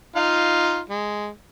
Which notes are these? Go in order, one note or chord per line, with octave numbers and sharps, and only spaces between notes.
D#4 F4 F5
G#3